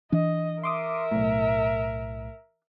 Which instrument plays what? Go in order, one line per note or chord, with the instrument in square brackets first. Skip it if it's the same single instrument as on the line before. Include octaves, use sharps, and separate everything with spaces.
[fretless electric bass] E3 D4 [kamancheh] D#5
[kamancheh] A#4 E5 [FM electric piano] C6 D6 D#6
[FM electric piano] B1 A2